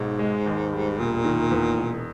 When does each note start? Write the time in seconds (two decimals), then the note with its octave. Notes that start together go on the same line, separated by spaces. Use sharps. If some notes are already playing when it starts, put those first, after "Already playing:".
Already playing: B1 G#2
0.19 G#3
0.46 D#2
0.73 G3
0.99 E1 A#2
1.25 D#3
1.51 E2
1.78 E1